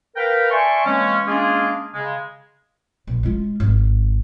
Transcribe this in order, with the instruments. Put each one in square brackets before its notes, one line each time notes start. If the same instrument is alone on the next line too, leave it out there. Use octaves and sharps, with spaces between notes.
[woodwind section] A#4 B4 F5 G5
D5 E5 G#5 A5 C6 C#6
E3 G#3 A#3 C4 C#4
G#3 A#3 C#4 D4 F4 G#4
C#3 G#3
[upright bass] A#1
G#3 F4
G#1